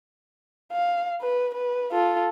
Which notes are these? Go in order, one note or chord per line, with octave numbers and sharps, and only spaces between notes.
F5
B4
B4
F4 A4